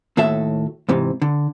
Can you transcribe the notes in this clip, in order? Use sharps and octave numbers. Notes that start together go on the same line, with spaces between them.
D#2 A2 F#4 A4 E5
G#2 C3 E3
D3